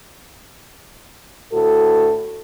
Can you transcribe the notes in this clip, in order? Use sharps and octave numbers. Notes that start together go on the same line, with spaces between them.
D2 A2 F#4 A4